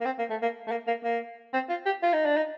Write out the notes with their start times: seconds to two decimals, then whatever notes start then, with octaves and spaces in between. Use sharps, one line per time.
0.01 A#3
0.05 C4
0.19 A#3
0.30 A3
0.42 A#3
0.67 A3
0.71 A#3
0.87 A#3
1.04 A#3
1.54 C4
1.69 F4
1.86 G4
2.02 F4
2.13 D#4
2.25 D4
2.36 D#4